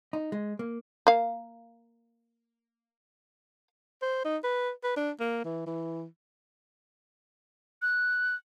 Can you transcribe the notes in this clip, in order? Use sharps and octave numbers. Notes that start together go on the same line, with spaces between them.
D#4
G#3
A#3
A#3 F5
C5
D#4
B4
B4
D4
A#3
E3
E3
F#6